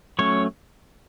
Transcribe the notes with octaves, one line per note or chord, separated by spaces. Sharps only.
F#3 A3 C#4 C#5